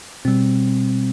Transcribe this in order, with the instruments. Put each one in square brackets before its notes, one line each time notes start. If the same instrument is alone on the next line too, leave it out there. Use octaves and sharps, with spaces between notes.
[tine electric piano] B2 G3 C4